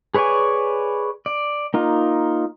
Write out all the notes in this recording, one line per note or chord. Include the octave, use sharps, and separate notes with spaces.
G#4 B4 C#5 D5 G#5
D5
A#3 D#4 F4